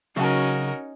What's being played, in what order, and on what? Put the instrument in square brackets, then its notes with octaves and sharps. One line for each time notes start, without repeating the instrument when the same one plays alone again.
[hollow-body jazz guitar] C#3 F#3 [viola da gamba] C#4 D#4 [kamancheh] F#4 A#4